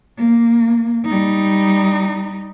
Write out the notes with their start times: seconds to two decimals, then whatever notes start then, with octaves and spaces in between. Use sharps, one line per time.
0.17 A#3
1.06 G3 D#4